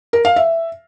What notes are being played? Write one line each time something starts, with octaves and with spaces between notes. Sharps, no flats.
A#4
F5
E5